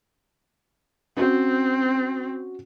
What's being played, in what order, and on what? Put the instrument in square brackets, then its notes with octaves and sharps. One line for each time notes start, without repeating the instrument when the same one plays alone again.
[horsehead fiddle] C4 [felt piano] C#4 F#4